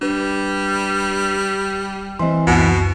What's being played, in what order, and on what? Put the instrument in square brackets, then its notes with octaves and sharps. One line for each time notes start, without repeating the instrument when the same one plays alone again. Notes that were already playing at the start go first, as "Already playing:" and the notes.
[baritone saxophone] G3 [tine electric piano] D4 B4
[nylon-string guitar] E3 C4 [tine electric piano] D#5 C6
[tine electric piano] C#2 F#2 [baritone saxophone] B2